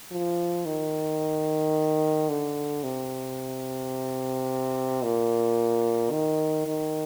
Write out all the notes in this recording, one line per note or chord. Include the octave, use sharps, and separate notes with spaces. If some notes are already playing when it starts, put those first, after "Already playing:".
F3
D#3
D3
C3
A#2
D#3
D#3